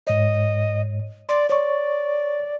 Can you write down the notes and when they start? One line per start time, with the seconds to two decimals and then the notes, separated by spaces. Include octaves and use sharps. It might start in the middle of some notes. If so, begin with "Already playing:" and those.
0.07 G#2 C#5 D#5
1.29 D5 C6
1.50 C#5 D5 C#6